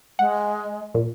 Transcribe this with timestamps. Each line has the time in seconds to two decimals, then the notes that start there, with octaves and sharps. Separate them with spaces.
0.19 G#3 F#5
0.94 A#2